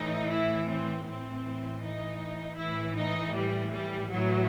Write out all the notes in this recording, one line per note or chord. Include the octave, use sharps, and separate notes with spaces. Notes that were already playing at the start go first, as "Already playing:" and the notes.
Already playing: A2 E3 D#4
E4
C4
A2 E3 C4
D#4
A2 E3 E4
D#4
G3
G3
A2 E3 F#3